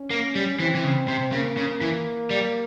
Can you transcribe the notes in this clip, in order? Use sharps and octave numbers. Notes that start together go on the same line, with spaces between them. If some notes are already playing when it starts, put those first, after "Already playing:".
Already playing: C#4
A#3
G3
E3 C4
E3
C#3
C3
C#3 A#3
C#3
E3
G3